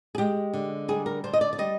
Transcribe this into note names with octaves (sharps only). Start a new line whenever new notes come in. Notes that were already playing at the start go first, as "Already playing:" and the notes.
G#4
G#3 G4
D3
G3 G#4
A#4
D3 C5
D#5
D5
D5
G3 D#5